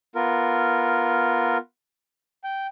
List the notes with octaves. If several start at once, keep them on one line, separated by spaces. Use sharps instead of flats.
B3 F4 A#4
G5